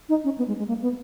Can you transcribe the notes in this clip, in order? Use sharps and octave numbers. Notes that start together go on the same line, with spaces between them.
D#4
C#4
B3
G#3
G#3
A#3
B3